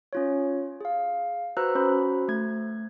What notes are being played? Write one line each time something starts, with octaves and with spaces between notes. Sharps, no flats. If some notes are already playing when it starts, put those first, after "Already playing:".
C#4 F4 C#5
G#4 F5
F#4 B4 C5 A#5 E6 F#6
C#4 F#4 C5 B5
A3 G#6